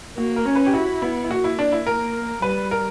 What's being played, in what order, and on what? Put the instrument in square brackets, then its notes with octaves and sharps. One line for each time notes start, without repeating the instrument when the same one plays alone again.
[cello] A#3 [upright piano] F#4
[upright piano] A#4
[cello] C#4
[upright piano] B4
G4
[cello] E4 [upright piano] F#4
[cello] B3 [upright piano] E4
[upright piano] E4
[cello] A#3 [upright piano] F#4
[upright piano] E4
D4
E4
[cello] A#3 [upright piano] A#4
[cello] G3 [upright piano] B4
[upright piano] A#4